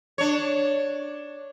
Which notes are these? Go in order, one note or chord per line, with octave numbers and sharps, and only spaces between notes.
D4 C#5